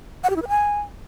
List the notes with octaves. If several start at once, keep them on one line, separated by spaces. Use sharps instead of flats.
F#5
G4
E4
B4
G#5